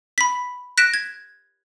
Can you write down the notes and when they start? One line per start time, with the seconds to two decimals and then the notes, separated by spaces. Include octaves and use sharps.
0.18 B5 B6
0.78 F#6 A#6 B6 D7 E7
0.94 G#6